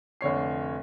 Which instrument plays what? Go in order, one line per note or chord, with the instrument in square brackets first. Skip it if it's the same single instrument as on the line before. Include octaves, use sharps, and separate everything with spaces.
[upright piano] F1 D3 C#5 C7